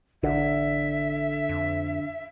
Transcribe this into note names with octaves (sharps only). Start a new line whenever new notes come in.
A1 D3 E5
F2